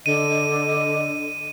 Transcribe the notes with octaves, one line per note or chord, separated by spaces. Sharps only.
D3 D#5 D#7